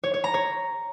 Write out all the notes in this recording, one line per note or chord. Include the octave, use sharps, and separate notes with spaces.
C#5
C#5
A#5
C#5